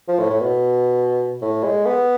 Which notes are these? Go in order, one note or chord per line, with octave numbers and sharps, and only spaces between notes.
F3
A2
A2
B2
A2
G#3
B3